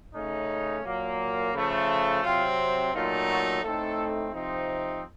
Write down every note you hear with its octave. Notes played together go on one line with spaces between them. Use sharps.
C#3 A3 C#4 D#4
A#2 F#3 A#3
C#3 F3 A3
C3 F#3 C4 F4
A#2 F#3 A3 D#4 F4
F#4
A2 A3 C4 D#4 A4
C3 F3 C4 D#4